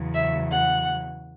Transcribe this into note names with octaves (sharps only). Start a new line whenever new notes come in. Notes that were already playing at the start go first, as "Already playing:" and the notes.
Already playing: E2 C#3 F#3
E5
F#5